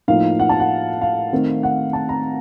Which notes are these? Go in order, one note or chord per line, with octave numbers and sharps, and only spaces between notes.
A2 F3 A#3 D#4 F5
F#5
A5
F#5
F5
D#3 A3 C4 D#4
F#5
A5
A#5